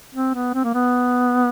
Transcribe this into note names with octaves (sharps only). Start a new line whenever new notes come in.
C4
B3
C4
A#3
B3